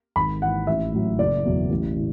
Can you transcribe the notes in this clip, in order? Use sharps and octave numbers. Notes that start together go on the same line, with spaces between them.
G#1 B5
G#2 E3 F#5
A1 E5
A2 F#3
F#1 D5
E2 B2 F#3
A1
A2 E3